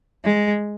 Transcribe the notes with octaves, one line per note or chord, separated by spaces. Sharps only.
G#3